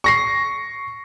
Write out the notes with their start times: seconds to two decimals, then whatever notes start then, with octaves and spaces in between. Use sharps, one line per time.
0.04 C#6 A#6 C7